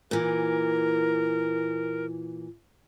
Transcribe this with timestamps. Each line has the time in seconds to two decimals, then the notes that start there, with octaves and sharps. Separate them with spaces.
0.11 A#2 E3 A#4